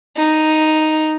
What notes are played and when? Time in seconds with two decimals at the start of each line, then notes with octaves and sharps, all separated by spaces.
0.17 D#4